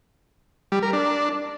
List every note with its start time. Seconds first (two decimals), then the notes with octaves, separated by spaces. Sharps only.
0.72 G3
0.83 A#4
0.93 D4